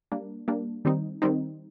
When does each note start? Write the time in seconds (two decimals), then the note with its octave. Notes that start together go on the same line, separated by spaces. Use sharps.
0.12 G3 A#3 D4
0.48 G3 A#3 D4
0.85 D#3 G3 C4 D#4
1.22 D#3 G3 C4 D#4